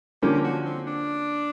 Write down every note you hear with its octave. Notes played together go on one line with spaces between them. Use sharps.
D3 F3 A#3 C#4 G4
F#4
C4
D4